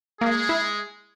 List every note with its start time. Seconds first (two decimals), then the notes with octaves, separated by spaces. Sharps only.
0.21 G#3 A#3 G#4
0.49 E4